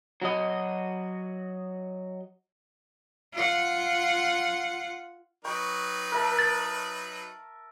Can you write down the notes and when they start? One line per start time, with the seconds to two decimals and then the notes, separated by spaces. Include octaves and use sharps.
0.22 F#3 F#4 D#5
3.33 F4 F#5
5.45 F#3 D#4 B4 G5 C#6
6.12 A#4 E5 A5
6.39 A6